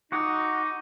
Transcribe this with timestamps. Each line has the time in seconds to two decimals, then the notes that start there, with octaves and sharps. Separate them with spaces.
0.12 D#4 F#4 F#5 D6